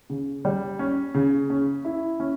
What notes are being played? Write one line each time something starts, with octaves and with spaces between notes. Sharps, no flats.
C#3
G3
C#4
C#3
C#4
E4
C#4